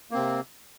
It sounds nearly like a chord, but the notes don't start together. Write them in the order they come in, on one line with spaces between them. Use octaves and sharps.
A#3 C4 C3